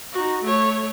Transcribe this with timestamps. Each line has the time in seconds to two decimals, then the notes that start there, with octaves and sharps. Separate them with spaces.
0.13 D#4 F#4
0.43 A3 C#5